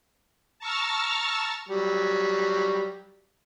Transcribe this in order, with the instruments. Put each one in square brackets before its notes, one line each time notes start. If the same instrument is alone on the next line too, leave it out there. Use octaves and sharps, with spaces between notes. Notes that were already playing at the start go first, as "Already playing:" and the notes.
[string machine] A5 A#5 C#6 E6 F6 A6
[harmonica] F#3 G3